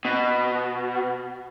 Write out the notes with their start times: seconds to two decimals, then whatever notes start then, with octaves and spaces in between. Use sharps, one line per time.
0.05 B2